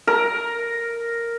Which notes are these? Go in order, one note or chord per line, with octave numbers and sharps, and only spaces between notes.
A#4